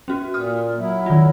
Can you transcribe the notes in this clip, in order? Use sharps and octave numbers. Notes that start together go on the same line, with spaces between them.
C#4 F#4
A#2 D#6 F6
F#3 E4
D#3 F4